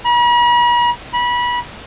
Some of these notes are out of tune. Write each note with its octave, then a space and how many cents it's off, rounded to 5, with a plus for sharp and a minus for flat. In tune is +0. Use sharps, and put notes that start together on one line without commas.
B5 -45
B5 -25